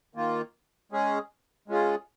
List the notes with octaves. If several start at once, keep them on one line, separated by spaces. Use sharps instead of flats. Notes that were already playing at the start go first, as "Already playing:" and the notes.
D#3 A#3 F4
G#3 C#4 G#4
G#3 C#4 F4 G#4